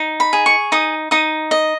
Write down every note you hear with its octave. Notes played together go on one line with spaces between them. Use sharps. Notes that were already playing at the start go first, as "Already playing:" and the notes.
Already playing: D#4
B5
G#4
C#6
D#4 D#6
D#4 D#6
D#5